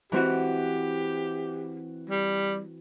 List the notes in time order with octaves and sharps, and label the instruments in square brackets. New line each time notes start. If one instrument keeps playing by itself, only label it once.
[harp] E3 C4 F#4 [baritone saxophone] G4
[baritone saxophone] G3